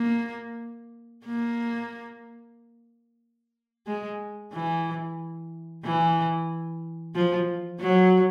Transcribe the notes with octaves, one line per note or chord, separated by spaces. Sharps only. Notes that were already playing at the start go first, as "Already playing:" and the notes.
Already playing: A#3
A#3
G#3
E3
E3
F3
F#3